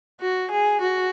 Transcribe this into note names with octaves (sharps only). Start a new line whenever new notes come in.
F#4
G#4
F#4